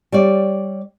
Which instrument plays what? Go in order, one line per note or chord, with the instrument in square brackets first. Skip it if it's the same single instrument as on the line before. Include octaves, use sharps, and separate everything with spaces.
[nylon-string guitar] G3 C#5 D5